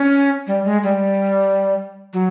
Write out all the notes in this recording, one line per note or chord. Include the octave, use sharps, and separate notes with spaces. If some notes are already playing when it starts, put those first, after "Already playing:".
Already playing: C#4
G3
G#3
G3
F#3